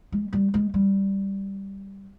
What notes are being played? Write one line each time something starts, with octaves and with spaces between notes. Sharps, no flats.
G#3
G3
G#3
G3